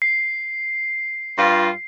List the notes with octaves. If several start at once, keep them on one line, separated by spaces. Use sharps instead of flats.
C7
G2 G3 F4